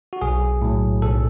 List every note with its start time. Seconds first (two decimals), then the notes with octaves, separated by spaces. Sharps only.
0.13 F#4
0.22 B1 G#4
0.62 A2 F#3
1.02 B1 A4